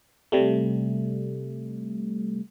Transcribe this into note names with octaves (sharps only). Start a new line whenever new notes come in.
C3 G3 A3